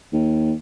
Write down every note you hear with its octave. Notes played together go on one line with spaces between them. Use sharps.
D#2